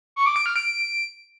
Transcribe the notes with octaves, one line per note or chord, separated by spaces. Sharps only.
C#6
D6
D7
F6
D7